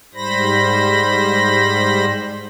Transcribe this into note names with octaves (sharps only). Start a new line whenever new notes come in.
G#2 G3 C5 B5 A#6